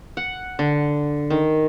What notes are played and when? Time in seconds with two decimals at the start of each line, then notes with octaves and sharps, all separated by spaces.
0.17 F#5
0.59 D3
1.30 D#3